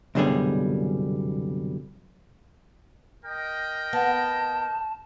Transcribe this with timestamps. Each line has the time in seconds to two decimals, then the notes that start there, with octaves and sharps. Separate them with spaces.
0.15 C2 F#2 B2 D3 G3 G#4
3.24 A#4 D#5 G5
3.93 B3 A5